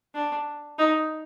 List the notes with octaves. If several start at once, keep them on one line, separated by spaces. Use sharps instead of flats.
D4
D#4